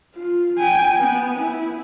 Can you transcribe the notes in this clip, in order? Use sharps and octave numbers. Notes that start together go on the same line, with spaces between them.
F4
G5 G#5
B3
E4